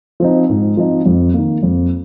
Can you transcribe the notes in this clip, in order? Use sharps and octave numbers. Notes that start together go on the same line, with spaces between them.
F3 C4 D#4
G#2
F3 C4 D#4
F2
D#3 A#3
F2